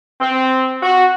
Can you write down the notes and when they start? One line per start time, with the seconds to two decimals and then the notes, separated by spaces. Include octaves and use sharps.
0.21 C4
0.82 F#4